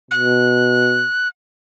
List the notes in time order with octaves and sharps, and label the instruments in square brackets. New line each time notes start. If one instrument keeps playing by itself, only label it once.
[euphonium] B2 [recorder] F#6